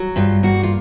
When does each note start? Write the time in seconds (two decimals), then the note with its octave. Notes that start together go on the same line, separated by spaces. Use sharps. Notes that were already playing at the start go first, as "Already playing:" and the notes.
Already playing: F#3
0.16 G2 F4
0.43 A#3 F#4
0.63 F4